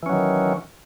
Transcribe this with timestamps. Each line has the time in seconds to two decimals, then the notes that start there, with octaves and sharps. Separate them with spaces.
0.03 E3
0.06 C#4
0.09 F#3
0.13 D#3